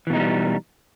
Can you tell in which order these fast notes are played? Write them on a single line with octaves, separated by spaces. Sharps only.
E3 B2 D#4 G#3 G3